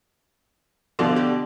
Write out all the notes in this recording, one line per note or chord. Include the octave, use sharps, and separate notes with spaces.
B2 D3 F3 F4 D5
G4